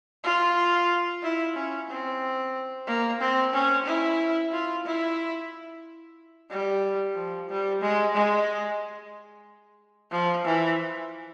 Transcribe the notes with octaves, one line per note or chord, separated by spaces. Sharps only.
F4
E4
C#4
C4
A#3
C4
C#4
E4
F4
E4
G3
F3
G3
G#3
G#3
F3
E3